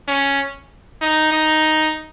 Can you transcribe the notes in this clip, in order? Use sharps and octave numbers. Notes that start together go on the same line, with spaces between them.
C#4
D#4
D#4